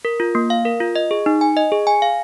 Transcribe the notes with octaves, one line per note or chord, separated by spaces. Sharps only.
A#4
F4
A#3
F5
A#4
F4
D#5
G#4
D#4
G#5
D#5
G#4
G#5
F5